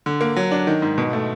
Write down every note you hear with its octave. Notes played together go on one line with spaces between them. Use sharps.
D3
A#3
F#3
D4
D#3
G#2
B2
A3